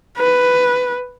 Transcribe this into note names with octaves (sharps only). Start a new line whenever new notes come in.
B4